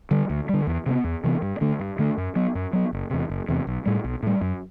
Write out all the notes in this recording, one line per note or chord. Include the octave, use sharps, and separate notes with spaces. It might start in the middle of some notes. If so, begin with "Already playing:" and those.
D3 G3
D2
D3 G3
E2
C3 E3 B3
E2
C3 E3 B3
G2
D3 A3 D4
G2
D3 A3 D4
F#2
F#3 B3
F#2
F#3 B3
F#1
E2 C3
F#1
E2 C3
B1
A2 G3
B1
A2 G3
F#2